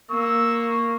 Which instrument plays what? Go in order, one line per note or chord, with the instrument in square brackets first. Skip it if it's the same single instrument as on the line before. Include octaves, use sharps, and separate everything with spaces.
[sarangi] A#3 [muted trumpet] C#6 [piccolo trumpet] E6